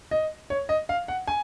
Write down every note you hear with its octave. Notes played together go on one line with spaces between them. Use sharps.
D#5
C#5
D#5
F5
F#5
G#5